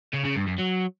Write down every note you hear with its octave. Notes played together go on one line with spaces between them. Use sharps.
C#3
C#3
G2
F#2
F#3